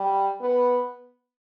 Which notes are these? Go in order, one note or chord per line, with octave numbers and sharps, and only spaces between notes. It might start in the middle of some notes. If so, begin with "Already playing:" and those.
Already playing: G3
B3